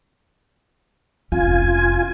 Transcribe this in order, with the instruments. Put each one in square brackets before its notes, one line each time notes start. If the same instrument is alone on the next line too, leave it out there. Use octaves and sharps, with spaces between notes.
[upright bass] F1 C#4 [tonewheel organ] F4 G#5